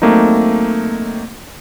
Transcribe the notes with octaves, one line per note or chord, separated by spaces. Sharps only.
F#3 A3 A#3 C4 D#4